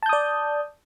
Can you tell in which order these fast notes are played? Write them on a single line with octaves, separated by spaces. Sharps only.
A5 G6 D#6 D5